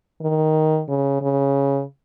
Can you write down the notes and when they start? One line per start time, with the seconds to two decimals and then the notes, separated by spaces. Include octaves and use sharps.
0.21 D#3
0.88 C#3
1.22 C#3